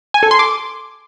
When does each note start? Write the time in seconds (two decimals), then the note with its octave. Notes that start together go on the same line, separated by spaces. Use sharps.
0.14 G#5
0.23 A4
0.31 C6
0.39 D6